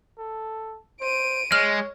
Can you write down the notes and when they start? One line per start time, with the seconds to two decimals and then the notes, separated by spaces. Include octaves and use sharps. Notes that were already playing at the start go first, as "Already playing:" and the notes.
0.18 A4
1.01 C5 D7 D#7
1.52 G#3 C#5 F6